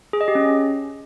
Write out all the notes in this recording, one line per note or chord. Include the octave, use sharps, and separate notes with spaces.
G#4
D#5
G4
C#4